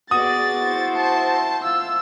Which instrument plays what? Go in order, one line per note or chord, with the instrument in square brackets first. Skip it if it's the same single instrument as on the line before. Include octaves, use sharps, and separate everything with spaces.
[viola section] B3 G#4 D5 [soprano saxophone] F#4 [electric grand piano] D#6 [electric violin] A6
[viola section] E4 C5
[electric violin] A5
[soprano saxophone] F4 [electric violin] E6